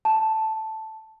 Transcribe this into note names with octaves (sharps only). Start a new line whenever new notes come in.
A5